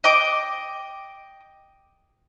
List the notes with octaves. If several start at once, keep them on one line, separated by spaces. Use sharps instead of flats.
D#5 G5 D6